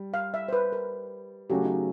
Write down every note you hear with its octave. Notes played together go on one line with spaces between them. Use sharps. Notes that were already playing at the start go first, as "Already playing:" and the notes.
Already playing: G3
F5
E5
C5
B4
A#4
C#3 F#3 A3 C#4 F#4 G4
D#4